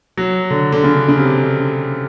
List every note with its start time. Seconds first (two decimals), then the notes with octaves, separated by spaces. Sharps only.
0.17 F#3
0.50 D3
0.72 D3
0.84 C#3
1.09 C#3
1.17 C3